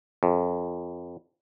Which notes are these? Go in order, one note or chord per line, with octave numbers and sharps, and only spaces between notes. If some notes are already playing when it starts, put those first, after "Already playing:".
F2